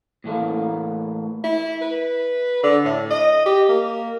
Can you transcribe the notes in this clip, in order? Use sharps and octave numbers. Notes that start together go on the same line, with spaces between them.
A2 E3 A3 A#3
E4
B4
D3
A2
D#5
G4
A#3